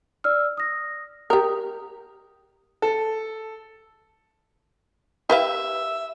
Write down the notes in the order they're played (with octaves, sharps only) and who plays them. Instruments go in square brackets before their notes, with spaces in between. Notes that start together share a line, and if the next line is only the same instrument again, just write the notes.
[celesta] D5 E6 F6
D#6 A#6
[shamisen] G4 A#4 [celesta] D#6
[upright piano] A4
[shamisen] G4 B4 F5 [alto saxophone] E5